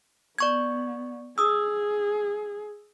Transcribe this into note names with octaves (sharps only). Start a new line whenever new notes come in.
B3 D5 C#6 G#6
G#4 D#6 E6